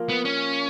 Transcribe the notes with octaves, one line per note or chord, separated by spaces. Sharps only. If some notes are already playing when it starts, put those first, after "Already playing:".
Already playing: F3 A#3 F4 A#4
B3
C#4